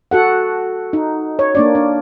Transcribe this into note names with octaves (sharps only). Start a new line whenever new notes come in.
F#4 A4 F#5
D#4
C#5
A#3 D4 D5
D4